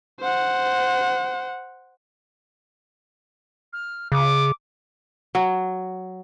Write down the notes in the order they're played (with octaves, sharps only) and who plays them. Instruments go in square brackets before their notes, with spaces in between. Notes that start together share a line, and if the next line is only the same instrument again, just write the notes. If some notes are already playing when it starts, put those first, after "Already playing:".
[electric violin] C5 F#5
[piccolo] F6
[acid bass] C#3 [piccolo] D6
[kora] F#3